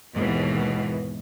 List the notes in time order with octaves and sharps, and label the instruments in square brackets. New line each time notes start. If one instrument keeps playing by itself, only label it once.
[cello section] D#2 G#2 B2 E3